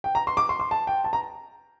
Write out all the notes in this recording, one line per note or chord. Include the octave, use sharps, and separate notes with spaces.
G5
A#5
C6
D6
C6
C6
A5
G5
A5
A#5